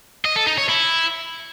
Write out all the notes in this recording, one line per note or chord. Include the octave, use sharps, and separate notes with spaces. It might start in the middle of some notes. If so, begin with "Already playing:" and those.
D#5
A4
D#4
C#5
E4